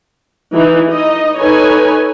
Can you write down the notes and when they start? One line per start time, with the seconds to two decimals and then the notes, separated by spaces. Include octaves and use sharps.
0.53 E3 D#4
0.90 D#4 D#5
1.40 D#4 A4 B4 C#5 G#5